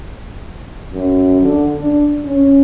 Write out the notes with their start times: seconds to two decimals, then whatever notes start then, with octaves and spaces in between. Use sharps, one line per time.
0.93 F#2
1.42 D3
1.74 D4
2.25 C#4